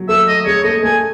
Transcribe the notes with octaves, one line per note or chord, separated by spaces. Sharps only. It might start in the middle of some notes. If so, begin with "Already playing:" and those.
Already playing: F#3
A3 E5
D#5
G#3 C#5
A3 D#5
A3 G#5